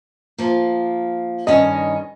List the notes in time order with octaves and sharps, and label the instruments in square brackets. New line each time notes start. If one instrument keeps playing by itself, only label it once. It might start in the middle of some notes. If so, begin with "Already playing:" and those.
[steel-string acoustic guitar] F3 A#3
[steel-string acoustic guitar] G2 D#3 C#4 [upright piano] D#5